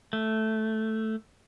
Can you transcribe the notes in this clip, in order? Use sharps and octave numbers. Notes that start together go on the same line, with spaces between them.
A3